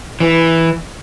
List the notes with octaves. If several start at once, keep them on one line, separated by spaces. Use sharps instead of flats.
E3